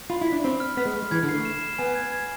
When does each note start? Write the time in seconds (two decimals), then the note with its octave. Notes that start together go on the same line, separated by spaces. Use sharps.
0.10 F4 B5
0.21 E4
0.27 B6
0.32 D4
0.44 C4 B5
0.60 F6
0.77 B3 B6
0.85 G#3
0.94 A3 F6
1.02 G#3
1.11 E3 G#6
1.23 D3
1.29 C7
1.34 A3
1.45 E7
1.62 E7
1.78 B3 G#5
1.95 G#6
2.12 G#6